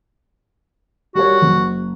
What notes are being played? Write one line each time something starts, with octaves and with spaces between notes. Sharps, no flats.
G3 F#4 A#4 C#5
F#1